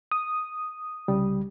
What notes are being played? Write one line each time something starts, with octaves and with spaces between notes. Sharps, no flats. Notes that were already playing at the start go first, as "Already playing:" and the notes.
D#6
C2 C#3 G3